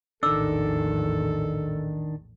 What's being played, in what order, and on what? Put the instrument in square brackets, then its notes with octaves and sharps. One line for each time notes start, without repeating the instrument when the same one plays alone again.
[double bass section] A#1 E2 A2 [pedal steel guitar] D#3 D4 [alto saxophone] A4 [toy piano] D6 E6